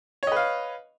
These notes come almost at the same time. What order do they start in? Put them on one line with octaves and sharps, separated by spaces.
C#5 D#5 B4 F5